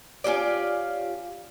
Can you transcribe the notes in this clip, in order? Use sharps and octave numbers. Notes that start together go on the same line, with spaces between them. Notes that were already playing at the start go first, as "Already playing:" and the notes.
C#4 F4 G4 D5